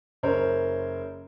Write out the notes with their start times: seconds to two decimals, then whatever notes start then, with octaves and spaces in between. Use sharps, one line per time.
0.23 F#1 A#4 C5 C#5